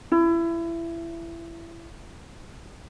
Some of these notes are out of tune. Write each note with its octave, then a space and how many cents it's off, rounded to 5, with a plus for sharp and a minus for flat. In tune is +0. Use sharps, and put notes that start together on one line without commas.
E4 +25